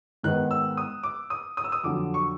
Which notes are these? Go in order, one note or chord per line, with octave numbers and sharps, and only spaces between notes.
G#2 D#3 G#3 B3 F#6
E6
D#6
D6
D#6
D#6
E6
D#6
F2 D3 F#3 D6
C#6